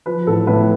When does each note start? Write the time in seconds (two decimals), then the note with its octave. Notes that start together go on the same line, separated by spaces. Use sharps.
0.06 F3 B4
0.27 A1 A4
0.47 A2 B4